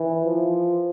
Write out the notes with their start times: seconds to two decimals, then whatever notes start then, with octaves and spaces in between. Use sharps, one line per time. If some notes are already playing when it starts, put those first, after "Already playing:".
Already playing: E3
0.26 F3